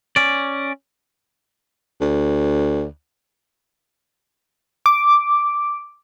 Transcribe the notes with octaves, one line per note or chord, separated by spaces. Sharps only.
C#4 D5
D2
D6